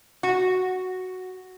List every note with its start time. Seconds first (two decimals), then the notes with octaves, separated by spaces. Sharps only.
0.23 F#4